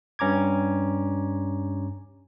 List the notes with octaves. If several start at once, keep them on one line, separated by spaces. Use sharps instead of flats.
G2 C#4 A#5 D6 G#6